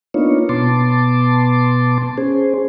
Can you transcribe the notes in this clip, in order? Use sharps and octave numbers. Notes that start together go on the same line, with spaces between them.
A#3 B3 D4 D#4 F4 C#5
B2 B3 A5 C6 D6
C#4 G#4 C5